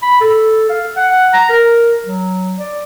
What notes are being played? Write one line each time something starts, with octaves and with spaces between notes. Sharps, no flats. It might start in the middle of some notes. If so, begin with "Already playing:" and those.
B5
A4
F5
F#5
A#5
A#4
F#3
D5